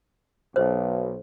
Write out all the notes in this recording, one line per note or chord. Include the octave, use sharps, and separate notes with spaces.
B1 C5